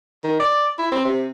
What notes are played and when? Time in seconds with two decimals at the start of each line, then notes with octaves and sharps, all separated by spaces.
0.24 D#3
0.39 D5
0.78 E4
0.91 C4
1.05 C3